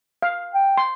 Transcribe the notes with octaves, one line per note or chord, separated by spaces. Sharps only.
F5
G5
C6